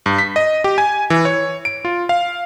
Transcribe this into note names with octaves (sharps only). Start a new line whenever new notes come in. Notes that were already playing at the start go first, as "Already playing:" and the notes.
G2
B6
D#5
G4
G#5
E3
C#5
D7
F4
F5